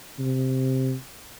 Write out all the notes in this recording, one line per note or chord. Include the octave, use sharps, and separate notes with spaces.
C3